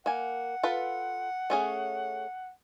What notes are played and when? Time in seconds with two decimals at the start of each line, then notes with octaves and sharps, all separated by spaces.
0.06 A#3 F#5 G#5
0.63 F4 A4 B4
1.50 A3 C#4 G#4